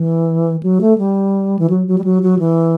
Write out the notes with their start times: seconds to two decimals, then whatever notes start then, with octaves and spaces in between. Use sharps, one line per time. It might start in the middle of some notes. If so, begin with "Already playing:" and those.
Already playing: E3
0.63 F#3
0.81 A3
0.98 G3
1.59 E3
1.70 F#3
1.87 F#3
1.98 G3
2.04 F#3
2.23 F#3
2.39 E3